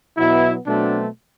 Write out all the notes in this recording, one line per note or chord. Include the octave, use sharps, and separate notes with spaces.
B2 F#3 B3 E4
B2 F#3 A3 C4 D4